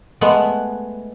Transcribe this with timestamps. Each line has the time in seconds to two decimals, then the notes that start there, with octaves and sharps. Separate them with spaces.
0.21 G#3 A3 B3 F#5